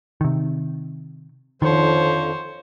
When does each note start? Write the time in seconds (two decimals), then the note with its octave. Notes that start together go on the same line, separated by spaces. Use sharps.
0.21 C3 D#3
1.62 F2 D3 D#3 F3 C5 C#5